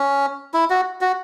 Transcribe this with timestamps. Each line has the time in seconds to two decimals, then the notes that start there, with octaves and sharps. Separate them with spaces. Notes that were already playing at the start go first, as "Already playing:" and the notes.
Already playing: C#4
0.54 E4
0.70 F#4
1.01 F#4